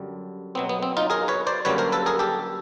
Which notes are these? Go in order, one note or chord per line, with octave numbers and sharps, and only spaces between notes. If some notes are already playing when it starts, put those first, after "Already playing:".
Already playing: F#2 D3 G3
B2 F#3 B3 C4
B3
C4
D#4 F4
G#4 A#4
B4 C#5
C5 D5
F#2 D3 G3 A#3 B4 C#5
A#4 C5
A4 B4
G#4 A#4
G4 A4